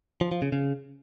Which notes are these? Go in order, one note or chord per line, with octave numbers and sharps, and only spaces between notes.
F3
F3
C#3
C#3